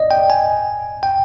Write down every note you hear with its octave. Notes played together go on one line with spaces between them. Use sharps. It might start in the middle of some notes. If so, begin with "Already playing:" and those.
Already playing: D5 D#5
G5
G#5
G5